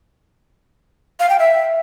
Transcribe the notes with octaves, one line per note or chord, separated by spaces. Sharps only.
F5
G5
E5